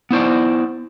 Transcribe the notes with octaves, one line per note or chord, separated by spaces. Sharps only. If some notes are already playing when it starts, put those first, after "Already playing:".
B3 E4 C5 D5